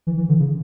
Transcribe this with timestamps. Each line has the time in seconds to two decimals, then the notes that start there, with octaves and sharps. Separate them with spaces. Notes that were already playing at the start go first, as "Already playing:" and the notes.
0.07 E3
0.17 E3
0.29 D3
0.39 C#3